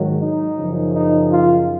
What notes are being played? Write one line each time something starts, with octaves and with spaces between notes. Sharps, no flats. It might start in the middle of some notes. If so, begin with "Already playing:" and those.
Already playing: G#2 D#3 F#3
D#4
F#2 C#3 F3
D#4
F4